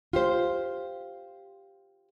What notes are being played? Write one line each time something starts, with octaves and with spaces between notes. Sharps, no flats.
F4 G4 C5